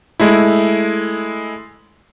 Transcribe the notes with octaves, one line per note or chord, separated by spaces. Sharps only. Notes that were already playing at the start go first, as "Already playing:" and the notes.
G#3 A3 E4